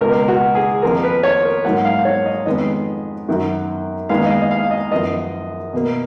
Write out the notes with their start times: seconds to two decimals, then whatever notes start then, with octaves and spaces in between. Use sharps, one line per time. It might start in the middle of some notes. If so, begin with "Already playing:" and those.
0.01 C#2 B2 A#3 A#4
0.28 F#4
0.55 G#4
0.82 F2 F3 A#3 A#4
1.03 B4
1.23 C#5
1.44 A#4
1.64 G#2 F#3 A#3 F#5
1.85 F5
2.05 C#5
2.26 D#5
2.46 F2 D#3 G#3 B3 D#5
3.28 F#2 D#3 F#3
4.09 D#2 D#3 G#3 B3 F5
4.26 D#5
4.30 F5
4.42 D#5
4.51 F5
4.71 D#5
4.91 F#2 F3 B3 D#5
5.73 B2 A#3